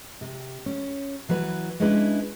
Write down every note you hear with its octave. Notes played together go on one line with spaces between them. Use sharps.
C3
C#4
E3 F#3 E4 B4
G#3 C#4 D4 E4 B4